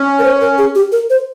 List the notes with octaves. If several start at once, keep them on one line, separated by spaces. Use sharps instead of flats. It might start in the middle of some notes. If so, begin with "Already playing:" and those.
Already playing: C#4
A#4
C5
A#4
G#4
G4
A#4
C5